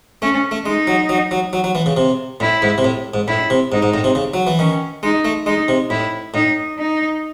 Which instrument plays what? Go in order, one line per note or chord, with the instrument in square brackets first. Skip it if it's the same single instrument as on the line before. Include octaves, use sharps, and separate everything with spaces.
[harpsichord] A3 [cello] C#4
[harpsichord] A3
[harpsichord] G#3 [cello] D#4
[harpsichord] F#3
F#3
F#3
F#3
F#3
E3
C#3
C3
[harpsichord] A2 [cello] E4
[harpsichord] G#2
C3
A2
G#2
[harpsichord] A2 [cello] E4
[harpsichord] C3
[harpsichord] G#2 [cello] D#4
[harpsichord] G#2
A2
C3
C#3
F#3
E3
[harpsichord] D#3 [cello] C#4
[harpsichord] G#3 [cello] D#4
[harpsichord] A3
[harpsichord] G#3 [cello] D#4
[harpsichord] C3
[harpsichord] A2 [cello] E4
[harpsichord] A2 [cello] D#4
[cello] D#4